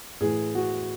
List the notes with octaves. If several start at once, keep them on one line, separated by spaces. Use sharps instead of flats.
A2 E3 G#4
F#4